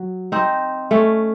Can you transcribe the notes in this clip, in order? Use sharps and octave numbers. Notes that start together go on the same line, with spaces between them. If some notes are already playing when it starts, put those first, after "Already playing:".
Already playing: F#3
C4 D#4
A3 C#4